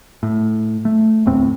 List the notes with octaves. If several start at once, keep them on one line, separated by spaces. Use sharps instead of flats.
A2
A3
D1 E2 A2 C4